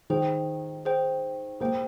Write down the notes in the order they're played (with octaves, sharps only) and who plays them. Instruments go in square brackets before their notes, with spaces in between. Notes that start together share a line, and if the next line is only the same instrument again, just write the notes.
[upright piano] D#3 [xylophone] G#4 C5 G5
[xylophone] G#4 C5 G5
[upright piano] A#3 [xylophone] G#4 C5 G5